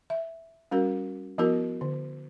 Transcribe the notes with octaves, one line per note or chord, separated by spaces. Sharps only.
E5
G3 C#4 F#4 A#4
F3 B3 E4 F#4 A#4
D3